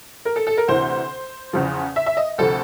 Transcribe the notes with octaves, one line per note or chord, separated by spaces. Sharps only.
A#4
A4
A4
A#4
D2 C3 E3 C5
E2 C#3 F3
E5
E5
D#5
D2 C3 F3 A4